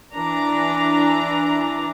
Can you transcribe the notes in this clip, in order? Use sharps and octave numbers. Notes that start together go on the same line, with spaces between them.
E3 D4 A#5